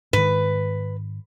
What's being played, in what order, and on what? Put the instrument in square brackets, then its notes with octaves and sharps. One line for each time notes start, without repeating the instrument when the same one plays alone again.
[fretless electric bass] G#2 D#3 [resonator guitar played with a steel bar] B4